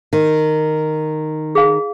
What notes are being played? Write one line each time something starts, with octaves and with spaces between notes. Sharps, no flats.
D#3
G#4 F5